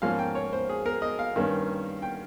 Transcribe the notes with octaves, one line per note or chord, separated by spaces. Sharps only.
G#2 F3 A#3 C#4 F5
G5
C#5
C5
G#4
A#4
D#5
F5
G2 D#3 A#3 C#4
G5